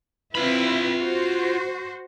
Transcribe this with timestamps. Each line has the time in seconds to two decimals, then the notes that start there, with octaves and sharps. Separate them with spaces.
0.35 C4 E4 F4 B4 B5
1.01 F#4 C5